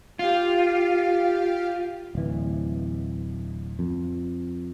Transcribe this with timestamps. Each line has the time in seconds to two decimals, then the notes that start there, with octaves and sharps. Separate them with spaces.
0.19 F4 G4 F5
2.15 D1 E3
3.79 F2